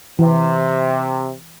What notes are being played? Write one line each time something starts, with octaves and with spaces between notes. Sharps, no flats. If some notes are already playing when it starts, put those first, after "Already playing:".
C3 E3